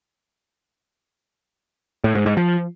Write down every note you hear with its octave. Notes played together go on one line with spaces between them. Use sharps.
A2
G#2
G#2
F3